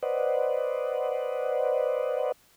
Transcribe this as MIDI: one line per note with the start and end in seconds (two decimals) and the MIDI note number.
0.03 2.32 71
0.03 2.32 72
0.03 2.32 74
0.03 2.32 75
0.03 2.32 78